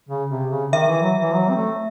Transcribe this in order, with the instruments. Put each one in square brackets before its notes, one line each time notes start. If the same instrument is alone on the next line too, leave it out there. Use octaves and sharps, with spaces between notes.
[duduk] C#3
C3
C#3
[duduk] D#3 [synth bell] E5
[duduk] E3
F#3
E3
F#3
C4
A3